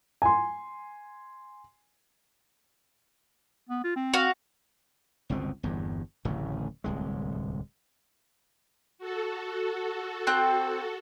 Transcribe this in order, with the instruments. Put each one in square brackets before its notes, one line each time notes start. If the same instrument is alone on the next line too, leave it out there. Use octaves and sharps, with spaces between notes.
[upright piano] G#5 C6
[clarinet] B3
F4
C4
[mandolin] F#4 F5
[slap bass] G1 C#2 B2 C4
G1 E2 G2
D1 A1 C#3
D1 C2 G#3
[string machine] F#4 A4
[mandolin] C4 G5 F#6